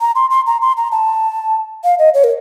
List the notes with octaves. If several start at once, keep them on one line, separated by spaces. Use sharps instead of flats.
A#5
C6
C6
A#5
C6
A#5
A5
F5
D#5
C#5
A#4